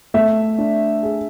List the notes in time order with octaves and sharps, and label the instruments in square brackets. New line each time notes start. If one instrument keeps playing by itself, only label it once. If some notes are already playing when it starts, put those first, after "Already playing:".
[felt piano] A3 [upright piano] E5
[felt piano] D4
G#4